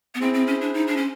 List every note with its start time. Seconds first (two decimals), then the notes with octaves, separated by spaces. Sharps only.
0.15 B3
0.21 C4 E4 G#4 C5
0.34 C4
0.47 C#4
0.61 D4
0.74 D#4
0.87 D4
0.97 C#4